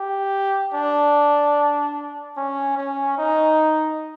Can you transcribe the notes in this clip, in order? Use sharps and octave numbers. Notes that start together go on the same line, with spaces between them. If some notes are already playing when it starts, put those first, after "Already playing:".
Already playing: G4
D4
C#4
C#4
D#4